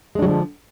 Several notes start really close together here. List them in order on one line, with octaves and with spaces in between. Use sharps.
G#3 D4 F#3 D3 F3